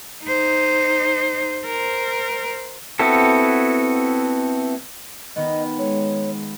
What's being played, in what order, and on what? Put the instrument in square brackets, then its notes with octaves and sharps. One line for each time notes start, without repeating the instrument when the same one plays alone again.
[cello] D#4 C5
A#4 C5
[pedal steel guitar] B3 C4 E4 F#4 A4
[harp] D#3 B3 [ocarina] D#5
[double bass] G#3 [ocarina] C#5